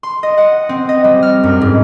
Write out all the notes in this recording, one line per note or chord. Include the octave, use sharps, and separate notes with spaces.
C6
D#5
F#5
C4
D#5
G3
F6
F#2
G#2